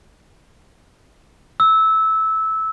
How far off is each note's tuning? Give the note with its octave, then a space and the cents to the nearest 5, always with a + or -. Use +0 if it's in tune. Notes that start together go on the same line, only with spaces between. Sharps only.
E6 -15